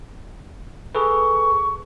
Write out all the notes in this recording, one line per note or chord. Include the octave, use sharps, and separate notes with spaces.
G#4 A4 B4 C#6